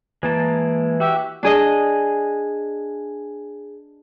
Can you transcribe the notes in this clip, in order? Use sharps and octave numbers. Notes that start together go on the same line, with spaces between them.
E3 G#3 A#3 A5
F#4 G4 E5
D4 G#4 D#5